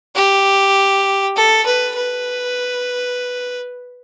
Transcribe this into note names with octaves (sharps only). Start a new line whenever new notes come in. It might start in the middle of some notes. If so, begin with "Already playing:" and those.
G4
A4
B4
B4